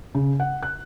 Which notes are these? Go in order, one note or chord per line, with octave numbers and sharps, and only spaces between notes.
C#3
F#5
F#6